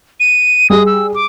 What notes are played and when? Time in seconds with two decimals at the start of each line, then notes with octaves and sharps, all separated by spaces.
0.20 D#7
0.70 G3 G#4 D#6
0.86 E6
1.14 D6